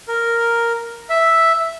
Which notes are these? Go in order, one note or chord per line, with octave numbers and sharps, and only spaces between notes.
A#4
E5